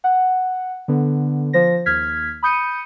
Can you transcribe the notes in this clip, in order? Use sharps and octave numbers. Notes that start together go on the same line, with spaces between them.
F#5
D3 B3
F3 C5 A#6
D#2 F6 G#6 B6
B5 D#6 G6 C#7 D#7